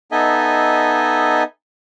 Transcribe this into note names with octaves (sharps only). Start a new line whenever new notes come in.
B3 D#4 A4 D#5 E5 G#5